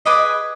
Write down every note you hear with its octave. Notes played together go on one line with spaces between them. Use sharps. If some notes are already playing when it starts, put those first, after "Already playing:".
G#4 B4 D#5 D6